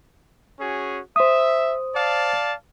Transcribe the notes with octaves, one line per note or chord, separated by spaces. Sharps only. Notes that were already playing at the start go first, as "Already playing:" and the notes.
C#4 F#4 G#4
C5 E5 D#6
D5 F5 A5